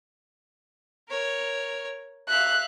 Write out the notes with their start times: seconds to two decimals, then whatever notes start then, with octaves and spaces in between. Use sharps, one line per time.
1.09 A#4 C#5
2.28 E5 F5 F#6